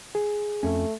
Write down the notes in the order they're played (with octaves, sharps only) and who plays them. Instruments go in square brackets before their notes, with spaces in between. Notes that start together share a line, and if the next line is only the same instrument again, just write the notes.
[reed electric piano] G#4
[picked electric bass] F2 C#4 [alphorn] A3